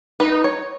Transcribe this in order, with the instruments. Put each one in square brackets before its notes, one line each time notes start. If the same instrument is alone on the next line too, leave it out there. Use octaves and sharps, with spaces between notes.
[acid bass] D#4 [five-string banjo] B4
[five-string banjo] C#5